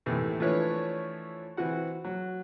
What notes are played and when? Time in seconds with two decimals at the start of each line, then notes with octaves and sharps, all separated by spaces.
0.06 D#2 A2 C3 E3 A3
0.40 E3 F3 A3 D4 B4 C#5
1.57 E3 C4 F#4 F#5
2.04 F#3